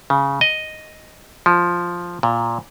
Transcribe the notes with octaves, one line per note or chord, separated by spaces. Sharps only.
C#3
D#5
F3
A#2